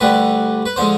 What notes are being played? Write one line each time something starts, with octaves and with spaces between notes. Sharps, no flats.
D2 D3 G3 B4
B4
D3 F3 G#3 C5